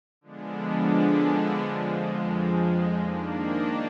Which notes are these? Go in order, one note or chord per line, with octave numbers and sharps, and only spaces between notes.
D3 F3 G#3 B3 D4
F2 F3 G#3
D#3 A#3 D4